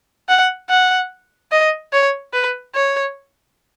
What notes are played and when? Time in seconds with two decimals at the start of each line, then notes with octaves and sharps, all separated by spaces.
0.29 F#5
0.69 F#5
1.52 D#5
1.93 C#5
2.33 B4
2.75 C#5